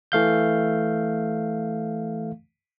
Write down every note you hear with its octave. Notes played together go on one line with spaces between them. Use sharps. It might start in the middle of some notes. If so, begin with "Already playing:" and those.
E3 A3 F5 G6